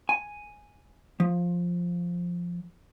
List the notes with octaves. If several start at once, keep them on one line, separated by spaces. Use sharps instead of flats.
G#5
F3